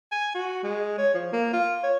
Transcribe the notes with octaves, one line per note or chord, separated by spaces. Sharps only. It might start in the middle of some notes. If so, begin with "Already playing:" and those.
G#5
F#4
G#3
C#5
F3
A#3
F4
C#5